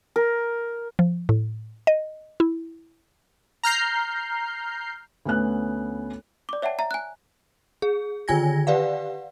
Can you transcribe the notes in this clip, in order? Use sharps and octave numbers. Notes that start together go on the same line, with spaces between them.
A#4
F3
A2
D#5
E4
A#5 F6 G6 C7
D2 B3 C#4 F#6
D5 D6
C#5 E5 F#5 G5 A5
E5 A#5
G#5 F#6
G#4
D3 D#3 F4 G#5 G#6 A#6
G4 B4 D5 F5 F#5